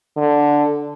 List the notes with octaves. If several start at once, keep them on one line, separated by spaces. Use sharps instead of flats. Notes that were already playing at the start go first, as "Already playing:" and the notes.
D3